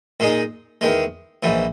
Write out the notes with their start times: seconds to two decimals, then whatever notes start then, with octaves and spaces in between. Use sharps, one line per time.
0.20 A#2 G#3 D#4
0.81 E2 D#3 G#3
1.43 A#1 G#2 E3